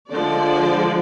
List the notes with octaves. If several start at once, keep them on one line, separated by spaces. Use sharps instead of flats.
D3 F3 G#3 D5